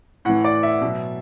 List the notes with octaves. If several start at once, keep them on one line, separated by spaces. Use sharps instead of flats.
A2 E3 F#5
D5
E5
B2 F#3